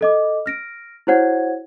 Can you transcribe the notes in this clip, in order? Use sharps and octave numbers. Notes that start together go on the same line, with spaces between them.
A4 D#5 D6
F6 A#6 D7
E4 F#4 C5 C#5 F#5 G#6